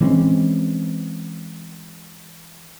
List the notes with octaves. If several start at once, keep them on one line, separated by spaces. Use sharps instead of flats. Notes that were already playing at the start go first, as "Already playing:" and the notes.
E3 G#3 C4 C#4